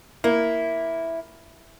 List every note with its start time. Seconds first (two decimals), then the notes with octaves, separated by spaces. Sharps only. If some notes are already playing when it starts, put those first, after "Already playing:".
0.24 A#3 E4